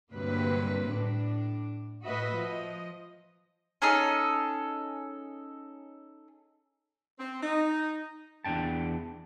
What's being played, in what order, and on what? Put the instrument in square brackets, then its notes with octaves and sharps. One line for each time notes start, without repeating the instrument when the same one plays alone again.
[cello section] D2 G2 C3 F#3 A#3 B4
A2 D4
A2 F#4 B4 D#5 E5
F3 D#5
[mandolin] C#4 D#4 G#4 A4
[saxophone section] C4
D#4
[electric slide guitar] E2 B2 D4 G5 A5